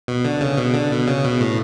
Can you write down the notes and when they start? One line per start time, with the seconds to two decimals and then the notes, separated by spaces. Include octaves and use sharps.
0.08 B2
0.24 D3
0.41 C#3
0.57 B2
0.74 D3
0.91 B2
1.07 C#3
1.24 B2
1.40 A2